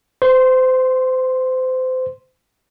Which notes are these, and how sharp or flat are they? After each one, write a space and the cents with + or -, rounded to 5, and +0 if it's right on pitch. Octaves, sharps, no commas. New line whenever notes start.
C5 -30 C6 +0